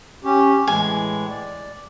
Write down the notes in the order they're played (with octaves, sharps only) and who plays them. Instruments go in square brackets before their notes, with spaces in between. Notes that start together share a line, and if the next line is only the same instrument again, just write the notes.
[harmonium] C#4 G4
[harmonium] A2 E3 G#3 [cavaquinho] G#5
[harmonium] D5